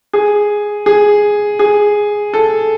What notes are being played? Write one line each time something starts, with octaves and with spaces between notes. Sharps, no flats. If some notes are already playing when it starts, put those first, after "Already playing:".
G#4
G#4
G#4
A4